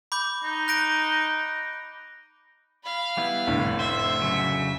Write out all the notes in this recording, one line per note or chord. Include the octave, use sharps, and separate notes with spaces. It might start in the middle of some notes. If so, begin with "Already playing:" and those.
B5 D6 G6
D#4
F#6 A#6 D7
F5 B5
G3 B3 E4
F1 A2 D3
C5 E5
C#3 F#3